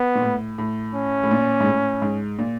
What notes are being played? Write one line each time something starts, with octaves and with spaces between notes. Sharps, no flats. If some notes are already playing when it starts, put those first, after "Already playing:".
Already playing: B3
A#2
A2
A2
C#4
A2
A#2
G#2
A2
G#2
A#2